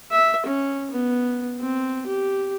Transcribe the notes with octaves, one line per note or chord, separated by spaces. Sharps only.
E5
C#4
B3
C4
G4